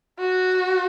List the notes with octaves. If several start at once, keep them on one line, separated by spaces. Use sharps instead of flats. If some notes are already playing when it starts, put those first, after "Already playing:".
F#4